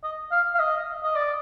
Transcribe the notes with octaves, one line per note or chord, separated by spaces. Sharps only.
D#5
F5
F5
D#5
D#5
D5